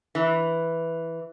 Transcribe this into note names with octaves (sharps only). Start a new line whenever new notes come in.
E3